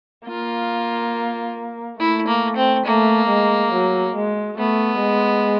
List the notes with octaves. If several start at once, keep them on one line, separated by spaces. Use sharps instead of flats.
A#3 F4
A3 E4
A#3
C4
A3 A#3
G#3
F#3
G#3
A3 B3
G#3